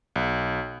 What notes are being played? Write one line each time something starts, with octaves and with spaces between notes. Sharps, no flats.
B1